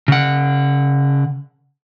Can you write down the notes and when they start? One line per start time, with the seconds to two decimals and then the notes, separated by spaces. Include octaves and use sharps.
0.08 C#3 F#5